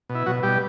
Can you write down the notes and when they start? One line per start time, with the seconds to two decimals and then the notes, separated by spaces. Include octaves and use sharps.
0.09 B2
0.15 E4
0.26 B2 F#3 F#4
0.43 B2 G3 G4